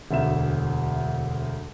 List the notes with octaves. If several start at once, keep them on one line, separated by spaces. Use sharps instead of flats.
E1 D2 E5 E7